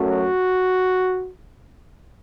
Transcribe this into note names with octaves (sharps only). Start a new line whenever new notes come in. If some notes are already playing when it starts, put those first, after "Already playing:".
Already playing: F#2 F#3 A3
F#4